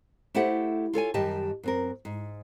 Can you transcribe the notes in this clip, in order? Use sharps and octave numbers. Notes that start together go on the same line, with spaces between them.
A3 E4 G4 A4 C5 F#5
F4 A4 C#5 G#5
F#2 D#3 G3 G4 D#5 A5
F#2 C4 A#4
G#2